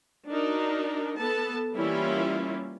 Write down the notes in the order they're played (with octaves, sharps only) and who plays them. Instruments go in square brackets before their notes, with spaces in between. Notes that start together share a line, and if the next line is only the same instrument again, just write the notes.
[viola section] D4 D#4 F#4 A#4
B3 A4 A5
E3 G3 A#3 C#4 E4 F4